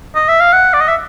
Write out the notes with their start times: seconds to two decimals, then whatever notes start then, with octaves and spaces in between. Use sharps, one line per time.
0.15 D#5
0.28 E5
0.40 F5
0.53 F#5
0.73 D5
0.81 D#5
0.88 E5